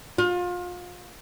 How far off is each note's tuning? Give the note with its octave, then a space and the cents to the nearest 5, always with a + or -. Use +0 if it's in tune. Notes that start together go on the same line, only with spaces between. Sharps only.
F4 +30